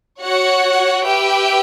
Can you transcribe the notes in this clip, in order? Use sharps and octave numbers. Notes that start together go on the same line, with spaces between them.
F#4 C#5 F#5
G4 B4 E5 G5